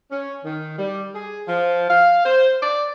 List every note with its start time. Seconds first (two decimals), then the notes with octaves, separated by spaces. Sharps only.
0.11 C#4
0.45 D#3
0.78 G3
1.14 G#4
1.47 F3
1.90 F5
2.25 C5
2.61 D5